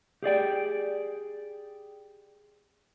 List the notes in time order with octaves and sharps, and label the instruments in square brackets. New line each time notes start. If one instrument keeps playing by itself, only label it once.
[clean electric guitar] G4 G#4 D5 G5